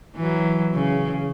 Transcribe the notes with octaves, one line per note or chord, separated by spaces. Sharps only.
E3 F#3
C#3